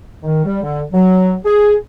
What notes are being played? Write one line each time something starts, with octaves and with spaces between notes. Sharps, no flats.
D#3
G3
D3
F#3
G#4